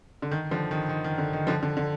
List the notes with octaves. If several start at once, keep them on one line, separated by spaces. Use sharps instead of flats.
D3
D#3
D3 F3
D#3
D#3
D#3
D3
D#3
D3 F3
D3
D3